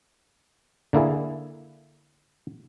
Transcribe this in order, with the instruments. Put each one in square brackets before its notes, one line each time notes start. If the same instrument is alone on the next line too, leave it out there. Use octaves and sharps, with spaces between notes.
[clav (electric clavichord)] D3 A#3 E4 G#4